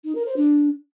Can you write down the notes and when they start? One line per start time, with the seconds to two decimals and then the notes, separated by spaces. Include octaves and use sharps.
0.05 D#4
0.15 A#4
0.26 C5
0.37 D4